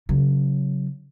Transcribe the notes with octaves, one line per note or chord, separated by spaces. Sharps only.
C#3 F#3